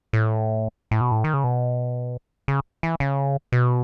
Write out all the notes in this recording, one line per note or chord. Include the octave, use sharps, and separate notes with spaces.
A2
A2
B2
A2
D#3
C#3
B2
C#3
E3
C#3
B2